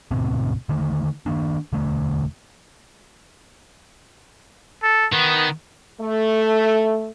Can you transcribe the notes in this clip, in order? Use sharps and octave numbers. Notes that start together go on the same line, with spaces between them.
D2 G#2 B2 C4
D3 D#3 A3
D#3 F#3 A#3 D4
E1 D3 A3
A4
D#3 B3
A3